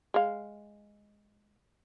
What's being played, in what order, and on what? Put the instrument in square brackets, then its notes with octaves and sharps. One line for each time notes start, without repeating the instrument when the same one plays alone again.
[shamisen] G#3 F5